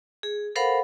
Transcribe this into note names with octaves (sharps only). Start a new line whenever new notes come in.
G#4
A4 A#4 C5 F5 F#5 B5